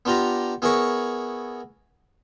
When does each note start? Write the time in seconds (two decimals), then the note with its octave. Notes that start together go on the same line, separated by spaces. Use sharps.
0.05 B3 D4 F4 G4 A#5
0.62 B3 E4 G#4 A#4 C#5 C#6